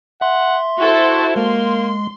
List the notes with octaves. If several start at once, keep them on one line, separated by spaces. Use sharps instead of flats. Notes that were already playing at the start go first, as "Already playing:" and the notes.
E5 F#5 C6
E4 F#4 A4 C5
G#3 A#3 C6